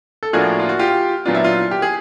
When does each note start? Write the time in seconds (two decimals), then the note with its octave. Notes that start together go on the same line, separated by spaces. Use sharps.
0.23 A4
0.33 A2 F3 A#3 D4 F#4 G#4
0.59 F4
0.69 F#4
0.79 F4 G4
1.25 A#2 F#3 B3 D4 F4
1.35 E4
1.44 F4
1.71 G4
1.82 G#4